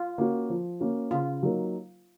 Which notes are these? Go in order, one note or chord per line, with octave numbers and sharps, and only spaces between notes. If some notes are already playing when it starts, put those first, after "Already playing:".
Already playing: F4
A#3 C#4 F#4
F3
A#3 C#4 F#4
C#3 F4
F#3 A#3 D#4 A#4